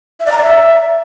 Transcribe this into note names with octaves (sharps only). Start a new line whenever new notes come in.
E5
D5
A#5
D5
E5